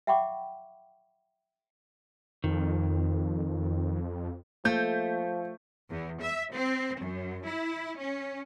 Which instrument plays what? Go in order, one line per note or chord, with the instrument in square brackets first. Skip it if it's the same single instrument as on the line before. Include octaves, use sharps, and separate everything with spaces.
[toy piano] E5 F#5 G5 B5 C#6 D6
[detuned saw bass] F2 [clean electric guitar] D#3
[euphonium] F3 [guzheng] A3 [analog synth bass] A#3 [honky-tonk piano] G6
[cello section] E2
E5
C4
F#2
E4
C#4